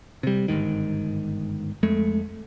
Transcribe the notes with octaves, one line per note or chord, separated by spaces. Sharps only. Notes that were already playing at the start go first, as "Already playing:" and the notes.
C3 G3
G1 C2 G#2 D#3
F2 G#3 A3